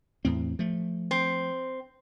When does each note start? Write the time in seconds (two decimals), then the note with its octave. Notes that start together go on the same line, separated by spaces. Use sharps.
0.25 E2 A2 C4
0.59 F3 A3
1.11 C4